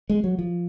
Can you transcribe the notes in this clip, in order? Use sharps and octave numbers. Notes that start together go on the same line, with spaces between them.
G#3
F#3
F3